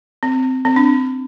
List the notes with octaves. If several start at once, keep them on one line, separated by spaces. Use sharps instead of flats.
C4
C4
D4